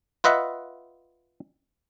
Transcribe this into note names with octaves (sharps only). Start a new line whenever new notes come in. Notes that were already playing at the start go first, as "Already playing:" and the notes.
F4 B4 D#5 E5 F#5